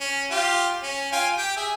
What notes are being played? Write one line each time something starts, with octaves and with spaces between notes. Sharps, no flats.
C#4
F4 G4
C#4
F4 G5 G#5
G4 G5
G#4 E5